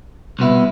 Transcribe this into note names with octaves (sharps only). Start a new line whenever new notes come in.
C2 B2 B3 E4